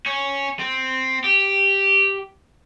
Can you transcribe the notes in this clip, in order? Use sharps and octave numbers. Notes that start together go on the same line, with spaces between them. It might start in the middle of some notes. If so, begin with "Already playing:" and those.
C#4
C4
G4